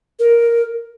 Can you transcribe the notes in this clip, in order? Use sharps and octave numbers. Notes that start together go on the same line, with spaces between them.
A#4